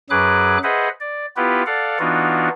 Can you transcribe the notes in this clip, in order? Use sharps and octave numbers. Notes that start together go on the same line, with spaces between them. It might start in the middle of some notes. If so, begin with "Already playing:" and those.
F#2 F#3 G#4 B4 D6 F#6
G#4 B4 C5 D#5 E5 F#5
D5
B3 E4 F4 G4 B4
A4 D5 F5 F#5
E3 B3 D4 D#4 F4 F#4